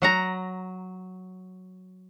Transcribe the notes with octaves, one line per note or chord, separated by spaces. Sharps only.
F#3 F#5 A#5